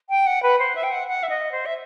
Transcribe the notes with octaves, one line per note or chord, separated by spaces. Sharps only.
G5
F#5
B4
C5
E5
G5
F#5
F#5
E5
D#5
C5
E5